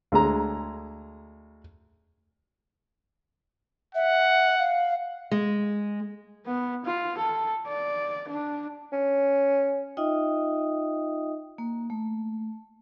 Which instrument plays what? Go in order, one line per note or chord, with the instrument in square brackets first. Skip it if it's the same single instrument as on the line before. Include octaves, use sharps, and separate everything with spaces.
[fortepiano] D2 G#3 A#5
[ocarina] E5 [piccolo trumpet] F#5
[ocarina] F5
[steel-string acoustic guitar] G#3
[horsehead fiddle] B3
F4
A4
D5
D4
[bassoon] C#4
[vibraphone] D#4 F4 D#5 E5 G5 D#6
A#3
A3